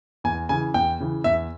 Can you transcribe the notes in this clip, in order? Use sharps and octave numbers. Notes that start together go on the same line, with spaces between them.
E2 G#5
C#3 E3 G#5
E2 G5
C#3 E3
E2 E5